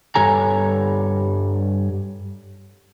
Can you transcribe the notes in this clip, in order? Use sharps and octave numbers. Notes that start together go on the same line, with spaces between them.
G2 G3 A4 C#5 G#5 A#5